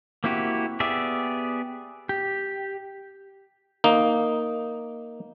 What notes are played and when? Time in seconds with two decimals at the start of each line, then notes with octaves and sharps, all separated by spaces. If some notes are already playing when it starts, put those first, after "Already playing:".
0.24 A#3 C4 E4 F#4 G4
0.80 B3 G4 G#4 D5 E5
2.09 G4
3.84 A#3 D#4